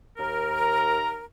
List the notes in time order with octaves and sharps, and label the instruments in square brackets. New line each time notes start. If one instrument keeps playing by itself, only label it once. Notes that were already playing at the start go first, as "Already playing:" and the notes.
[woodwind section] D#2 A#4
[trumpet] A#5